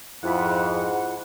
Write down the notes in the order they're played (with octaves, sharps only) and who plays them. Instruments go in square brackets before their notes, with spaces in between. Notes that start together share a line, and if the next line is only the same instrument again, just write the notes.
[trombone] F2 [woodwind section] G#2 F#5 [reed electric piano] E4 F4 B5